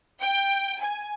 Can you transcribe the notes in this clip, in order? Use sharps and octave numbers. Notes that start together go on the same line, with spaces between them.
G5
G#5